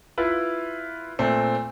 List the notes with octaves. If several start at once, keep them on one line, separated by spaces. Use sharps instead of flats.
E4 F4 B4
A#2 A3 C4